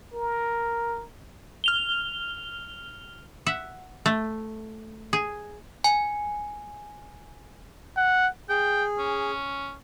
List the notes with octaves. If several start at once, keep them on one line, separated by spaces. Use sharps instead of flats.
A#4
F6 F7 G7
E5 F#5
A3
G#4
G#5
F#5
G#4 G5
C#4